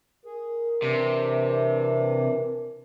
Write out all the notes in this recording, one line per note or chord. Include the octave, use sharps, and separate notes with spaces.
G#4 A#4
C3 E3 D4